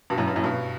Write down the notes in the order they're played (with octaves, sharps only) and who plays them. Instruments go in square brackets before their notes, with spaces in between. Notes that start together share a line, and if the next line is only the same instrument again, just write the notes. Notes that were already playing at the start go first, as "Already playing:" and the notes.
[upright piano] G2 B2
F#2 A2
G2
F#2 A2
G2 B2